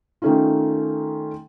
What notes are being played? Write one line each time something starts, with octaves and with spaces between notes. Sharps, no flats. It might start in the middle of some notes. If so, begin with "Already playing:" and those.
D#3 A3 C#4 D#4 F4